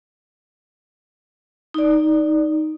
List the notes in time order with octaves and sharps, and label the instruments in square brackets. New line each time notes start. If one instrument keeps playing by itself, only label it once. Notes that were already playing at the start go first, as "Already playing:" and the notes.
[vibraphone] D#4 D5